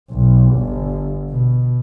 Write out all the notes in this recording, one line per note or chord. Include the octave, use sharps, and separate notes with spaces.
B1
G1
B2